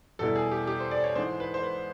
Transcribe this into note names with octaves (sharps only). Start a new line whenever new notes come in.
E2 B2 G3 B3 E4 A4
G#4
G4
G4
C5
D5
C#5
G#2 E3 G#3 C5
B4
C5
B4